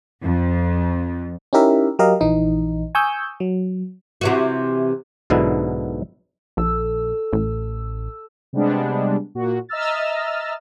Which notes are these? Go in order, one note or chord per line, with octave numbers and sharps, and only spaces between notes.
F2
C#4 D#4 E4 G4 A#4 E5
F#3 G4 A#4 D#5 F5
A#1 E3 D#4
G#5 C#6 D#6 E6 G6
F#3
C3 E3 F#4
B1 G#2 B2 D3 B3 E4
A#1 A4 E6
A1
C3 G3 G#3 B3 D4
A#2 F#4
D#5 E5 A#5 E6 F6 A6